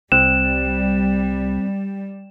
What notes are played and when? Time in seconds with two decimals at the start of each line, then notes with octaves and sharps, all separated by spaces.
0.12 C2 G3 C4 F#6 E7